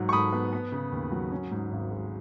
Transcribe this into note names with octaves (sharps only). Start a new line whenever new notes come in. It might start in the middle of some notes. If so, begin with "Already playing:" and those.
Already playing: G#2 F#3
C#6
G#2 B5 D#6
B3
B3
C#3
D#2
F#3
C#4
G#2
G#1
G#3